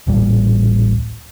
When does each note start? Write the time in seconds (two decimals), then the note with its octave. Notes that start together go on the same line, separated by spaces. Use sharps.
0.07 D1 A1 A#2 G3